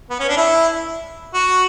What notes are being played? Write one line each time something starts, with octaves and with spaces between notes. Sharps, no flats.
B3
C#4
D4
E4
F#4